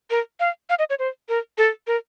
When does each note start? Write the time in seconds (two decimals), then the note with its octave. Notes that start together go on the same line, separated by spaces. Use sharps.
0.10 A#4
0.40 F5
0.70 F5
0.79 D#5
0.90 C#5
0.99 C5
1.29 A#4
1.58 A4
1.87 A#4